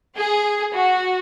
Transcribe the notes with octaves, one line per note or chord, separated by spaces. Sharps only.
G#4
F#4